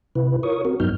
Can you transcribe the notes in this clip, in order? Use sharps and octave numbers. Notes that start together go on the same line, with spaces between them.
C3 E4 B4
F4 A#4 C#5 C#6 D#6
C4 F#4 A#4
G2 F#3 B3 D#4 F6 G6